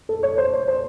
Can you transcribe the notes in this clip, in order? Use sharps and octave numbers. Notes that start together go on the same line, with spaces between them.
A4
C#5
C5
C#5
C5